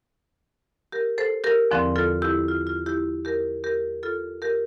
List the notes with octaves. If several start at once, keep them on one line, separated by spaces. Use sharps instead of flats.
G4 A#4
A4 C5
G4 A#4
E2 D3 F3 C4
F4 A4
E4 G4
F4
F4
E4 G4
G4 A#4
G4 A#4
F4 A4
G4 A#4